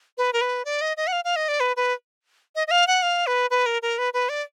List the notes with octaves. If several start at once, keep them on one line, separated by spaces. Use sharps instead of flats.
B4
A#4
B4
D5
D#5
D#5
F#5
F5
F5
D#5
D5
B4
B4
D#5
D#5
F5
F#5
F5
B4
B4
A#4
A#4
B4
B4
D5